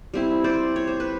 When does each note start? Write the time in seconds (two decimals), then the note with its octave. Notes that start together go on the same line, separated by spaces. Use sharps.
0.14 G3 C4 E4
0.44 C5 D5
0.76 C#5
0.87 C5
1.00 B4